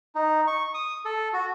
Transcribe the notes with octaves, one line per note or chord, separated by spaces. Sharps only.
D#4
C#6
D#6
A4
F#4